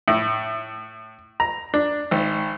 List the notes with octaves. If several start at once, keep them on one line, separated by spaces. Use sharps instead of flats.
A2
A#5
D4
G#1